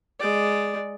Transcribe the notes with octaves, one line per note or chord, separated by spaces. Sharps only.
G#3 D5